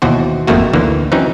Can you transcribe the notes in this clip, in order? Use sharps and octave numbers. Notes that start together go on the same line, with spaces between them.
D#2 B2 E3 F#4 C5
G#1 F2 D#3 A3 A#3 F#4
D2 D3 E3 A#3
E3 F#3 C4 C#4 D#4